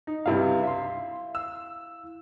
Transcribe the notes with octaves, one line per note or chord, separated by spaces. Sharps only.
D#4
C#2 G2 C3 E4 F5
E5 C6
E6